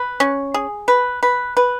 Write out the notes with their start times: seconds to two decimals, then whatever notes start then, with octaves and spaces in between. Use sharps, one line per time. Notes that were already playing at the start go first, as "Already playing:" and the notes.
Already playing: B4
0.20 C#4
0.54 G#4
0.88 B4
1.23 B4
1.57 B4